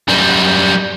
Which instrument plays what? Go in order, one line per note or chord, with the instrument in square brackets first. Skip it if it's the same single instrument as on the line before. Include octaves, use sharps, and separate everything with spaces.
[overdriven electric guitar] F#2 G3